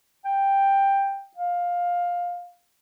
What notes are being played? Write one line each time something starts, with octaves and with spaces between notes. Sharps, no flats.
G5
F5